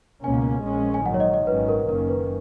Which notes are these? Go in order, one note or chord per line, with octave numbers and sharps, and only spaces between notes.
C#2 B2 A#3 C#4 G#5
A#1 A#2 G#3 C#4
G#5
G#2 D#3 F#3 F#5
C#5
D#5
D#5
G#1 G#2 D#3 F#3 C#4 B4
A#4
F#1 F#2 D#3 A#3 C#4 A#4
B4